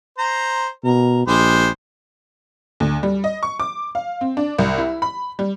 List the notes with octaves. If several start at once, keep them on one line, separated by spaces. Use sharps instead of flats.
C5 A#5
B2 A#4
A#1 G3 G#3 C5
D2
G3
D#5
C#6
D6
F5
C4
D4
C2
E4
B5
G3